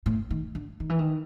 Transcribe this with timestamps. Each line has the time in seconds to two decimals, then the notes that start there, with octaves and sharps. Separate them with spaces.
0.06 A2
0.30 D#3
0.55 D3
0.80 D#3
0.89 E3
0.99 D#3